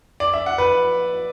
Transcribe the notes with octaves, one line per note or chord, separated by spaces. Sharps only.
D5
E5
F#5
B4